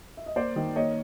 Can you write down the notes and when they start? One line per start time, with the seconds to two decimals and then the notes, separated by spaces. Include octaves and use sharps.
0.17 E5
0.26 D#5
0.36 A#3 C5 D5
0.56 D#3
0.76 A#3 C#5 D#5